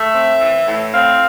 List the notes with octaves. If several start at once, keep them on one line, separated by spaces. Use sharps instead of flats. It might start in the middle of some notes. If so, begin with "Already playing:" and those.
Already playing: A3 E5
C4
E3
A2
C4 F5